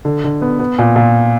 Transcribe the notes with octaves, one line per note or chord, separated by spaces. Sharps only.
D3
D3
B3
B3
A#2
A#2